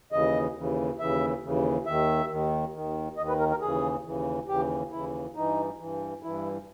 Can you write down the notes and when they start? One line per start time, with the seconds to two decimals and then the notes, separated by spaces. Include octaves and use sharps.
0.12 D#2 C#3 E3 D#5
0.56 D#2 C#3 E3
0.99 D#2 C#3 E3 E5
1.43 D#2 C#3 E3
1.86 D#2 D#3 E5
2.30 D#2 D#3
2.74 D#2 D#3
3.17 D#2 D#3 D#5
3.29 B4
3.40 A#4
3.50 A#4
3.61 D#2 C#3 E3 G#4
4.05 D#2 C#3 E3
4.48 D#2 C#3 E3 G4
4.92 D#2 C#3 E3 E4
5.35 G2 E3 D#4
5.79 G2 E3
6.23 G2 E3 E4